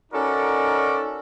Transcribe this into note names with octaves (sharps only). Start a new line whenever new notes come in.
C#4 D#4 F#4 A4 A#4 D5